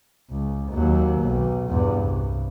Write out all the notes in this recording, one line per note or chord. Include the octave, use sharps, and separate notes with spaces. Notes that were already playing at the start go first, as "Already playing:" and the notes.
C#2
D#2 F#3
B1
E2 G2
C2